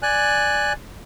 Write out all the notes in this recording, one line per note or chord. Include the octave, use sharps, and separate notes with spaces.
D5 G#5 F#6